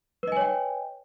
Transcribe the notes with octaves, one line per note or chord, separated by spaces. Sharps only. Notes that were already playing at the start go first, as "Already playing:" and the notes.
B4 C#5 D#5 G5 G#5